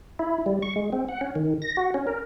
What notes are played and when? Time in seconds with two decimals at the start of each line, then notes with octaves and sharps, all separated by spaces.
0.19 E4
0.46 G3
0.62 C#6
0.76 G#3
0.92 C4
1.08 F#5
1.21 C#4
1.35 D#3
1.62 A#6
1.77 F#4
1.94 C#4
2.07 A#4